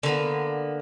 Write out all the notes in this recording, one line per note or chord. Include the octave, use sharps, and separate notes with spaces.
D3 A#3 B3